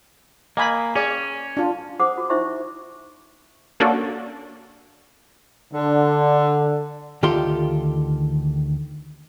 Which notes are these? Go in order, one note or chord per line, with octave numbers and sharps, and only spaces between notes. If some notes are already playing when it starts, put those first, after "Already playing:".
A#3 D#5 G#5 B5
C#4 G#4 D5
D4 F4
G#4 C5 F#5 D6 D#6
F#4
D#4 E4 C5 E5 C#6
A#3 C#4 D4 F#4 A4
D3
D2 D#3 F4 G4 A4 C6